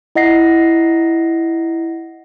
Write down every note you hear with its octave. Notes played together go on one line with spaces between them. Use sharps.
E4 D#5 F#5 A#6 C7